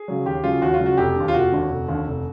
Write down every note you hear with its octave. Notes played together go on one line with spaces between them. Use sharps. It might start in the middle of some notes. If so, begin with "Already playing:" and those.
Already playing: G#4
C#3 F#3
D#2 G4
C#3 F#3 F4
D#2 F#4
F4
C#3 F#3
F#4
F1 G4
D#2 D3
F4
F1 F#4
D#2 D3
F1
D#2 D3
F1